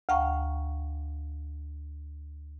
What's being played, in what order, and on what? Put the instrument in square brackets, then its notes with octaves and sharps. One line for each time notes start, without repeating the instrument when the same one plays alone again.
[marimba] D2 F5 G5 A#5 C#6